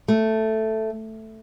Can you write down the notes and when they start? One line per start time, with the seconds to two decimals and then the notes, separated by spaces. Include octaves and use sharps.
0.08 A3